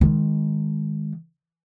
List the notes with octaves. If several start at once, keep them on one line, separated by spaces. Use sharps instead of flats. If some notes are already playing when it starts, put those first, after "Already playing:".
D#3 G#3